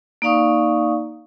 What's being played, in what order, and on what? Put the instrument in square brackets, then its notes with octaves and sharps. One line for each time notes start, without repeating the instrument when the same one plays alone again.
[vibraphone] A#3 D#4 D5 F5 C#6 D#6